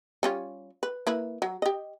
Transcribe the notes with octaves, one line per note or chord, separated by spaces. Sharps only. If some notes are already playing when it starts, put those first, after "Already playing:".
G3 C#4 F4
B4
A#3 E4 B4
F#3
G4 D#5